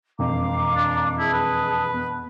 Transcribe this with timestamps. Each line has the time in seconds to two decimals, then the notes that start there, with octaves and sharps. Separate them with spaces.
0.19 E1 F2 F5 A#5 D6
0.76 D4
1.19 E4 G#4 A5 D#6
1.34 B4
1.93 B3